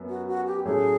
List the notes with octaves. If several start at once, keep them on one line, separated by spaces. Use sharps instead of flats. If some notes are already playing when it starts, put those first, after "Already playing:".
Already playing: F#2 B3
F#4
F#4
G4
A2 F#3 A3 C#4 G#4